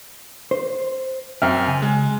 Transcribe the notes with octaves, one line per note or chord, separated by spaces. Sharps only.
C5
F#2 C4 E5 G5 F6
C#3 G#5
G#3